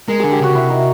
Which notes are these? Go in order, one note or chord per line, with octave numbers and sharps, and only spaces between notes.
G#3 A#4
D3 G#4
G4
C#3 F#4
C3 E4
D#4